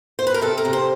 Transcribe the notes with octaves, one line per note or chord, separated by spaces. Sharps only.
C5
B4
A#4
C3 A4
A#4
C3
C5